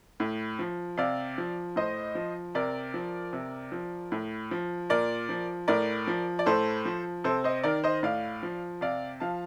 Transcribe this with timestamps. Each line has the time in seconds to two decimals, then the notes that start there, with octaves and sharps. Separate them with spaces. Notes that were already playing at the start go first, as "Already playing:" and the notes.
0.20 A2
0.59 F3
0.97 C3 D5 F5
1.38 F3
1.76 A2 C5 D#5
2.15 F3
2.55 C3 A#4 D5
2.94 F3
3.33 C3
3.72 F3
4.12 A2
4.51 F3
4.90 A#2 A#4 D5
5.29 F3
5.68 A2 A#4 D5
6.07 F3
6.39 D5
6.46 A2 A4 C5
6.85 F3
7.24 C3 A4 C5
7.44 C5 D#5
7.64 D#3 A#4 D5
7.84 C5 D#5
8.03 A2 D5 F5
8.43 F3
8.81 C3 D5 F5
9.20 F3 F5 A5